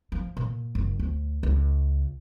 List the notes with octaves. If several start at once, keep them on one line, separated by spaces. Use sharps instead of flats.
F3
A#2
F#1
D2
C#2